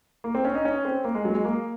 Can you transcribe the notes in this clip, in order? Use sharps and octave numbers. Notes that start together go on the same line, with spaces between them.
A#3
C4
C#4
D#4
C#4
C4
A#3
G#3
F#3
G#3
A#3